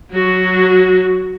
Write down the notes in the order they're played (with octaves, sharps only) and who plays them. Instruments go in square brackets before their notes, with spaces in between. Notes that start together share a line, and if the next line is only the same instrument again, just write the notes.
[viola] F#3 F#4